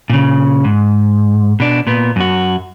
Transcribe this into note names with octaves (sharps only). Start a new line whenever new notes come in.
A#2 C#3
G#2
B2 D4
A#2 B3
F#2 F#4